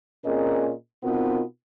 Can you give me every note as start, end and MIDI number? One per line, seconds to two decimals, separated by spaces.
0.25 0.72 46
0.25 0.72 60
0.25 0.72 61
0.25 0.72 68
0.25 0.72 70
0.25 0.72 75
1.03 1.42 47
1.03 1.42 59
1.03 1.42 60
1.03 1.42 63
1.03 1.42 65
1.03 1.42 70